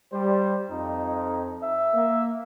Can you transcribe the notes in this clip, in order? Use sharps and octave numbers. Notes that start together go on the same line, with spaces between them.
G3 C5
F2 D#4
E5
A#3